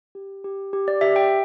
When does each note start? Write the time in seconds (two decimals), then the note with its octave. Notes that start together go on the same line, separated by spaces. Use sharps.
0.15 G4
0.44 G4
0.73 G4
0.88 D5
1.01 G4 E5
1.16 G5